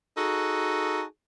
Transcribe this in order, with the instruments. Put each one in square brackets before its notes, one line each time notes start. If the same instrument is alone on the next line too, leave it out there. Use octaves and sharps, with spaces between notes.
[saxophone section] D#4 F#4 G#4 A4